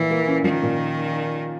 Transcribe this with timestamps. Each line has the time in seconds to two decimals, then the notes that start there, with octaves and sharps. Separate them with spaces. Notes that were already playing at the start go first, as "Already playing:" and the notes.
Already playing: A#2 E3 F3
0.10 A#3
0.27 C#4
0.44 D#3 F3
0.62 A#2